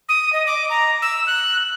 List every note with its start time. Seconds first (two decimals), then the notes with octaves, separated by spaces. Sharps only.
0.09 D#6
0.33 D#5
0.46 D6
0.70 A#5
1.02 E6
1.27 F#6